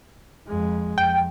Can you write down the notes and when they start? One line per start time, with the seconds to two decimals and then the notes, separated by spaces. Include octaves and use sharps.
0.48 F2 G#3
0.98 F2 G5